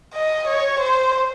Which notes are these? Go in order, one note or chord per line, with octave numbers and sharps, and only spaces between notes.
D#5
C#5
C5